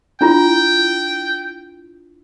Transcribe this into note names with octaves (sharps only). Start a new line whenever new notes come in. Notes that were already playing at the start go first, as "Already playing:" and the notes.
D4 E4 F4 G5